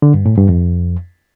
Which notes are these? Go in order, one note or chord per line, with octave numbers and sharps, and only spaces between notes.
D3
G2
A2
G2
F2